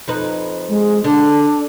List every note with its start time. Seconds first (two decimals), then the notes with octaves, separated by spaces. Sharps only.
0.08 F2 D#4 B4
0.69 G#3
1.04 D3 D4